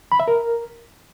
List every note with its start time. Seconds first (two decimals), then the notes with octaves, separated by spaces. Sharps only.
0.12 B5
0.20 E5
0.28 A#4